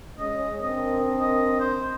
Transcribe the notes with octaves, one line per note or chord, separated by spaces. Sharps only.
G#3 C#4 D#5
C4 D4 A#4 D#5
D#5
C5